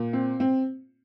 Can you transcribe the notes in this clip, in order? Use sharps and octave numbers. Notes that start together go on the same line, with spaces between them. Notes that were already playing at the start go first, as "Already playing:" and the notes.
Already playing: A#2
C4
C4